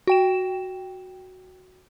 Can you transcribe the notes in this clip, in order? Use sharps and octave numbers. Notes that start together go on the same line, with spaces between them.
F#4 G5 E7